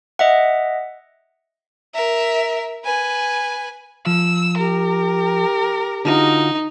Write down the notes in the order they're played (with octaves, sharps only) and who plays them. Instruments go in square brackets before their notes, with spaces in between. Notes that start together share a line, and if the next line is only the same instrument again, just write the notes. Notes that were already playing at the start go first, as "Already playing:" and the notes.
[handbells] D#5 E5 F#5
[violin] A#4 E5
B4 G#5
[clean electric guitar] F3 [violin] E6
[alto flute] G4 [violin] A#4
[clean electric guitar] D3 F4 F#4 [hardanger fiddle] D#4